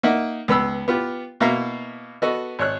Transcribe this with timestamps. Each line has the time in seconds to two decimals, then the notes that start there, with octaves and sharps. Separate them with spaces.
0.03 A#3 D#4 E5 F#5
0.48 C#2 B3 B5 E6
0.88 B3 F4 G4
1.40 B2 A#3 E4 E5 F5 A#5
2.22 B3 F#4 A4 D#5
2.59 G#1 C#5 F#6